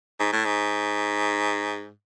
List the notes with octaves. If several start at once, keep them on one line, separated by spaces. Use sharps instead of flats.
G#2
A2
G#2